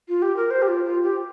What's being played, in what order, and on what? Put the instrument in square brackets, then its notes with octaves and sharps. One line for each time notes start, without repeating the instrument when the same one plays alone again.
[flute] F4
G4
A#4
C5
G4
F4
F4
G4